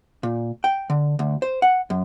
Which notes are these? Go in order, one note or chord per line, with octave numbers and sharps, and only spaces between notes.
A#2
G5
D3
D2
C5
F#5
F#2